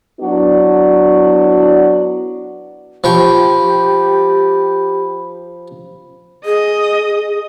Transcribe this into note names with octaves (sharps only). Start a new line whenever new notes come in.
F#3 B3 D4 E4 F#4
F3 G4 G5 B5 C#6
G#4 D#5